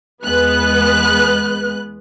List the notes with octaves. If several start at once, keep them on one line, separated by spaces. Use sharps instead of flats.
E2 G#3 B3 B4 F#6